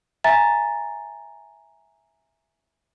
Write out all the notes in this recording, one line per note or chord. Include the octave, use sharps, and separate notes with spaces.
E5 G#5 A#5 A6